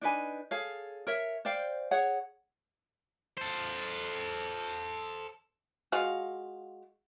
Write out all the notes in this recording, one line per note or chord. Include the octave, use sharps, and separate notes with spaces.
D4 D#4 B4 G#5
G#4 A4 C#5 F5
A#4 C#5 E5
C5 D5 F5 G5
G#4 C#5 F#5
A4 C5
G#3 F4 F#4 F5